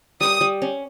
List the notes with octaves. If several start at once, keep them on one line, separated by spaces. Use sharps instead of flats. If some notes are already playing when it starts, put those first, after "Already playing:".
G3 D#6
G3
C#4